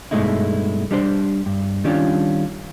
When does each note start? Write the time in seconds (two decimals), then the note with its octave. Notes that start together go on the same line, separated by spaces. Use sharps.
0.11 G2 B2 G#3 A3 D#4 E4
0.91 G3 D4 C5
1.46 G2
1.84 D#3 G3 C#4 D4 F4